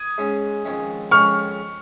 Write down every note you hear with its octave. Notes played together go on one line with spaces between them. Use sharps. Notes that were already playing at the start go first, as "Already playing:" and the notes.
Already playing: D#6 G#6
G#2 G#3 C#4
F2 D#3 G#3 C#4
F2 D#3 G#3 C#4 C#6 F6